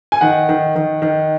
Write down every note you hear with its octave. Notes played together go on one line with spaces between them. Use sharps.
G#5
D#3 F#5
D#3
D#3
D#3